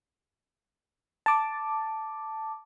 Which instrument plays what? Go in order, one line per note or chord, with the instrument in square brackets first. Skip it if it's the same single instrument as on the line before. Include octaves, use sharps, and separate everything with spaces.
[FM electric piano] A5 D6